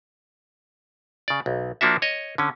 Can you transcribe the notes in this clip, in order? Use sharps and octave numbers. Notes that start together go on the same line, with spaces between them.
C#3 D5
B1
F3 A#3 D4 F#4 E5
C#5 D#5
D3 C#4